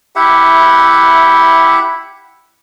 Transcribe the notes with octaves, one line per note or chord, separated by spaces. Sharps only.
E4 G4 E5 F#5